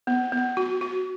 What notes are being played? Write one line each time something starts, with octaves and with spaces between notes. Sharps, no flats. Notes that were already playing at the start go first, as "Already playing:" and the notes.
B3
B3
F#4
F#4